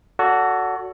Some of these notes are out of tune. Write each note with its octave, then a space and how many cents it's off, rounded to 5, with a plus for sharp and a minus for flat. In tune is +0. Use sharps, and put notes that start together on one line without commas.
F#4 +0 A4 +10 D5 -45